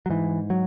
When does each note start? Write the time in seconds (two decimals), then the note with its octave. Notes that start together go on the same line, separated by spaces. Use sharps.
0.06 F#3
0.10 G#2 E3
0.50 F#3